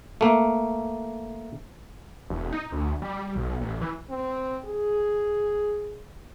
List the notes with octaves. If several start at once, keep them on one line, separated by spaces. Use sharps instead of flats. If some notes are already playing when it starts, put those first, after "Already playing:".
A3 A#3
E1
D#4
D2
G3
B1
A1
E3
C4
G#4